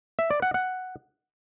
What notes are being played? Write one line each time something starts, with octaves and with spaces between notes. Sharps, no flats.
E5
D5
F#5
F#5